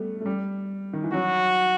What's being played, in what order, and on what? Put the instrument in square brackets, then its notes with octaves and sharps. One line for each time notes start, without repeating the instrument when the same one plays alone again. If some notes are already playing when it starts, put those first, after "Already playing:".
Already playing: [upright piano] G3 A3 B3
A3
G3
D#3
E3
[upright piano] F#3 [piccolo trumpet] F#4